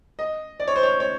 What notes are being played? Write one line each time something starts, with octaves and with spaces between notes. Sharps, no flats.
D#5
D5
C#5
C5
C#5
C#5